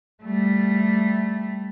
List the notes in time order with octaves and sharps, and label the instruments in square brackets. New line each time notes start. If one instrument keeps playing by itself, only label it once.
[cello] G3 A3